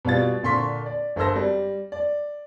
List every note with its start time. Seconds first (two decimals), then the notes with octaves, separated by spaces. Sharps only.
0.05 B2 G3 F4 A6
0.43 A#2 D3 C6 C#6 B6
0.86 D5
1.16 G1 A4 A#4 C5 E6 A#6
1.35 G3
1.92 D5